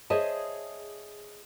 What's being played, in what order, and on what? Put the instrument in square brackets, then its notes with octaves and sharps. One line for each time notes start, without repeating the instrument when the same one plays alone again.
[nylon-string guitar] G#4 C5 C#5 D#5 E5 A5